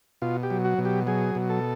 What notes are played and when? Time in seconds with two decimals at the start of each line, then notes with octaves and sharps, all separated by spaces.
0.22 B2 F4
0.43 G4
0.50 F#3
0.65 F#4
0.78 B2
0.85 G4
1.07 F#3 G#4
1.35 B2
1.49 A4